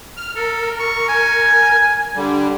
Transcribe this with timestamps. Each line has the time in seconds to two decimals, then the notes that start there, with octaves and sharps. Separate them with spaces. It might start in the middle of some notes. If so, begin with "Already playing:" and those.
0.17 F6
0.36 A4 A#4
0.80 C#6
1.09 G#5
2.16 D3 G3